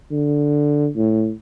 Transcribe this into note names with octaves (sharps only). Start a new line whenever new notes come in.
D3
A2